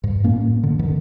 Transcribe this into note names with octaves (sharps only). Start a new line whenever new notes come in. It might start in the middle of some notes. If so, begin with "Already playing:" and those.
G2
A2 A#3 C#4
D3
G#2 D3 D#3